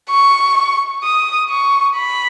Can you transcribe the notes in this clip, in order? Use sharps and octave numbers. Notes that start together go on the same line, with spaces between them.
C#6
D#6
C#6
B5